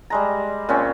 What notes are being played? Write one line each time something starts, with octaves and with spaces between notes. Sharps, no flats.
G3 G#3 A#5
A#2 C4 C#4